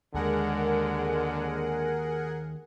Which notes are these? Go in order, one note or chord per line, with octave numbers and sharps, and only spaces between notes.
D#2 D3 G#3 G#4 A#4 F#5